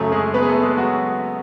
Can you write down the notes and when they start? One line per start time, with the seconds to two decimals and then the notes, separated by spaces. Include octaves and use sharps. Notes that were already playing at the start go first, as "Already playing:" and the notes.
Already playing: F#2 C#3 F#3 A3 A4
0.12 G#3 G#4
0.34 B3 B4
0.42 G#4
0.49 A3 A4
0.63 G#3 G#4
0.77 F#3 F#4